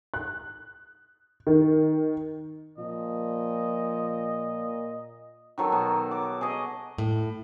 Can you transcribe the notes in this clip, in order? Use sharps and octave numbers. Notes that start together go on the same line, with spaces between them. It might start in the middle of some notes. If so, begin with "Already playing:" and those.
F#6
D#3
A#2 F3 D#5
D#3 F#3 A4
B2
D6
G#4 C#5 D#5
A2